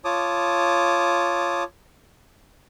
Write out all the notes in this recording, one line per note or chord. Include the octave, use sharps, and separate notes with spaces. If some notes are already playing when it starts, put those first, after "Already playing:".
F4 C#5 A5 D6 D#6